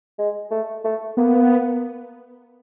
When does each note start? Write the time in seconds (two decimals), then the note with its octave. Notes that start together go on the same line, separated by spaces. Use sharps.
0.19 G#3
0.51 A3
0.84 A3
1.17 A#3 B3